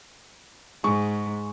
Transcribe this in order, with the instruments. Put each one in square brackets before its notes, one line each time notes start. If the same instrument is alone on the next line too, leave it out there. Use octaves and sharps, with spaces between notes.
[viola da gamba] G#2 [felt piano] G#3 C#6